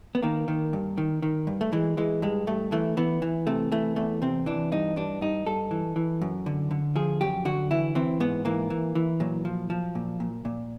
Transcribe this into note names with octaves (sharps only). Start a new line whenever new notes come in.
B3
D#3 A#3
D#3
G2
D#3
D#3
G2
A3
E3 G#3
E3 G#3
G2 G#3
G2 A3
E3 A3
E3 B3
E3
C3 A3
E3 A3
E2 A3
C3 C4
E3 D4
G2 D#4
G2 D4
G2 D#4
G2 A4
E3
E3
F#2
D3
D3
F3 G#4
F#2 G4
D3 F#4
E3 E4
E3 C4
G#2 B3
E3 A#3
E3
E3
A#2 F#3
F3
F3
A#2
A#2
A#2